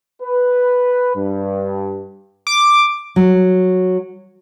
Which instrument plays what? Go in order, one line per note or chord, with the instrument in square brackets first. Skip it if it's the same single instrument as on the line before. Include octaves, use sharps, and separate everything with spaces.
[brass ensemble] B4
G2
[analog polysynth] D6
[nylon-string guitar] F#3